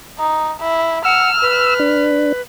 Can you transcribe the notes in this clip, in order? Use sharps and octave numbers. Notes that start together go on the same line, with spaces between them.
D#4
E4
F#5 E6 F6
B4
D4